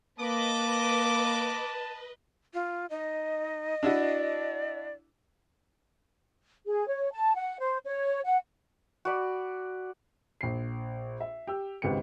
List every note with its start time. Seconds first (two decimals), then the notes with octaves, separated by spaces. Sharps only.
0.19 A#3 B4 D#5 A5 D6
2.54 F4
2.91 D#4 D#5
3.83 D4 E4 F#4 D5
6.66 G#4
6.86 C#5
7.12 A5
7.35 F#5
7.59 C5
7.85 C#5
8.25 F#5
9.05 F#4 D5 B5
10.41 A#1 C7
11.21 E5
11.47 G4 E6
11.82 G#1 C#2 B3 G4 C#7